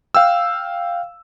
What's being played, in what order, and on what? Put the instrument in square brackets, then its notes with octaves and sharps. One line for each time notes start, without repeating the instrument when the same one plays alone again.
[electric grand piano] F5 G5 E6